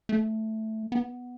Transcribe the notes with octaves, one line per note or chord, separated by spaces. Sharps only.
A3
B3